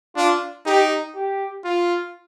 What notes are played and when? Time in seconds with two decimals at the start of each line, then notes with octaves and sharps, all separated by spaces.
0.16 D4 F4
0.66 D#4 G4
1.15 G4
1.64 F4